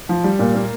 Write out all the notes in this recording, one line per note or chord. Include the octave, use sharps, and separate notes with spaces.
F3
G3
A#2
A#3